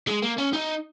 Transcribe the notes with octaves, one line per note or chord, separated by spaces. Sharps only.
G#3
A#3
C#4
D#4